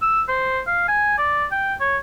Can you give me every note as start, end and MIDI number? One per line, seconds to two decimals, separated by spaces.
0.02 0.23 88
0.29 0.61 72
0.67 0.85 77
0.88 1.13 80
1.18 1.45 74
1.52 1.75 79
1.80 1.98 73